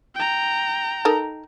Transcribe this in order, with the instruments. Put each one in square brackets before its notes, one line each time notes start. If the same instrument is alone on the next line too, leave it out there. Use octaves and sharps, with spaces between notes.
[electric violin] G5 A#5
[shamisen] D#4 A4 A#4